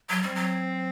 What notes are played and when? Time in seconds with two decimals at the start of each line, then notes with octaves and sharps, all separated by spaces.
0.10 F#3
0.22 G3 C4
0.35 F#3